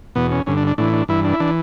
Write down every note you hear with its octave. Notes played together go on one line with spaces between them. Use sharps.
E2 B2 B3
C#4
G2 D3 C#4
D4
D4
A2 E3 D4
D4
G2 E3 E4
D4
E4
E3 D4